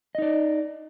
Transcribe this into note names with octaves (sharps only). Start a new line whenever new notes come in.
D#4 D5 D#5